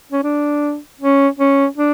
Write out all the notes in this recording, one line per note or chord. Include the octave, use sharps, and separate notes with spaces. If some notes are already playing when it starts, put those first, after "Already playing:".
C#4
D4
C#4
C#4
D4